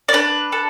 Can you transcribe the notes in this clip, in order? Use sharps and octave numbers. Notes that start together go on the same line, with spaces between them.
D5
D4 B4
A4